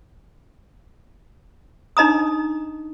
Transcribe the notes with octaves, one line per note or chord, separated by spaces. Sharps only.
D4 D#4 D#5 A#5 D#6